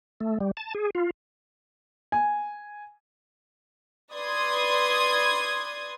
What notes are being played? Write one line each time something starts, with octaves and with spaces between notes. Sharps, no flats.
A3
G3
A5
G#4
F4
G#5
B4 D5 C6 D#6 G#6